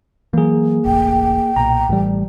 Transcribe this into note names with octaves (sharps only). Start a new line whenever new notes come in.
E3 F#3 A#3 G#4
E1 A1 G5
B1 A#2 A#5
A1 A2 G3